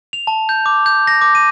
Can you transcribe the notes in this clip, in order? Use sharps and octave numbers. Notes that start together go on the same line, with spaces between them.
F7
A5
G6
D6
G6
A#6
D6
D#7